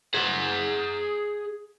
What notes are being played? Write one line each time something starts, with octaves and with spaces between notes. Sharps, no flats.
G#4 F#5